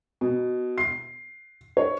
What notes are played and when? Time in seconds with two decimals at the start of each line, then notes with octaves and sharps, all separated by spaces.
0.21 B2
0.78 C7
1.77 C#5